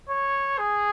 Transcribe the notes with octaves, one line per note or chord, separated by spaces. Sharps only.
C#5
G#4